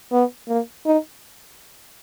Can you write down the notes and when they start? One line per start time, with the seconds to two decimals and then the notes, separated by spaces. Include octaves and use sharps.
0.12 B3
0.48 A#3
0.86 D#4